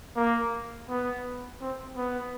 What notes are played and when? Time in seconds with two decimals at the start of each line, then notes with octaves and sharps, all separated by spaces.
0.16 A#3
0.89 B3
1.61 C4
1.97 B3